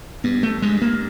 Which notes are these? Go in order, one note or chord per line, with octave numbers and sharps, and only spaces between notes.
G2 B3
A3
G2 G#3
A#3